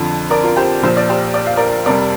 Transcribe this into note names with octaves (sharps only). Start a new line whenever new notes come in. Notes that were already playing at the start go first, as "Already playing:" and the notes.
Already playing: F2 D3 F3
A#4 D5
F4 A#4
G4 C5
A#1 A#2 F3 C5
D5
G4 C5
D5
F5
A#4 D5
F2 C3 G3 A#4 D5